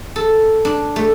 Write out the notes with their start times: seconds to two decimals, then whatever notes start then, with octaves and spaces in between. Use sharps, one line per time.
0.16 A4
0.65 D4
0.96 A3